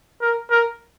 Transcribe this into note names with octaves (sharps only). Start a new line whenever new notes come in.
A#4
A#4